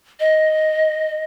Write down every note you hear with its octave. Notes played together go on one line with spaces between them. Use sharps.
D#5